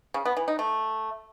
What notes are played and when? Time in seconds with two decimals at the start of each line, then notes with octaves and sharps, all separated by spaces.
0.14 C#3
0.25 B3
0.37 E3
0.48 D#4
0.59 A3